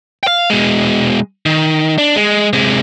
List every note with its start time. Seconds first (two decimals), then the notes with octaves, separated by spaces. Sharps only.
0.23 F5 G5
0.50 B2 G#3
1.46 D#3
1.98 D4
2.16 G#3
2.53 C3 G#3